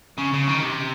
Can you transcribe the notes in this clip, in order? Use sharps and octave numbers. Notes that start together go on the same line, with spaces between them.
C#3
C#3
D#3
C3